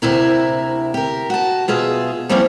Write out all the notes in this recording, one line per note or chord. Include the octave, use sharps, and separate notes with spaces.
D2 C3 E4 A#4
G4 A#4
F#4 A5
B2 F4 G#4 E5
F3 G3 A#3 C4 C#4 E4